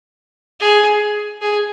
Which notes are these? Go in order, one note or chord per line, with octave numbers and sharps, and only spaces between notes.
G#4
G#4